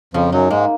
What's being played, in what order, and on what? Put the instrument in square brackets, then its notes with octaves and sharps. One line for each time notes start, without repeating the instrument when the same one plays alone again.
[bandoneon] F2 F3 [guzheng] C#3
[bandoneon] F#2 F#3 [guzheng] D#4
[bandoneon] G#2 G#3 [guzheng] A#3